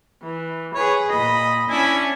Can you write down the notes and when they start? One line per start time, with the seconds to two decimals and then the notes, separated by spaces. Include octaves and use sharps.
0.21 E3
0.75 G#4 B4 C#5
1.10 A#2 D#5 B5
1.69 C#4 D4 E4 G#5